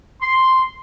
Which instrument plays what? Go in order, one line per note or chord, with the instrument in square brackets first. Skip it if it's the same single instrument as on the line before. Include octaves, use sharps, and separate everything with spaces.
[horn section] C6